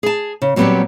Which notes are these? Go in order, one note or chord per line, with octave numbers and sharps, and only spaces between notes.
G#4 A5
C#3
A#2 F#3 G3 B3 C4 G4